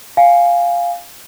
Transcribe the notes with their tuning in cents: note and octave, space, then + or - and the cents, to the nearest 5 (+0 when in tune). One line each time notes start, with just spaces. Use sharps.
F5 +0 G#5 +0